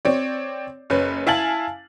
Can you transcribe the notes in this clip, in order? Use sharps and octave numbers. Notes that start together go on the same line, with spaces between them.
C4 C#5 D5
F#1 C#4 B4
E4 F5 G#5 A5 A6 F#7